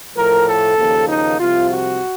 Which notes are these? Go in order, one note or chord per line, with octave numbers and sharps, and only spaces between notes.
A2 F3 A3 A#4
A4
D#2 C#3 F3 A#3
D#4
C2 C3 F3 F4
F#4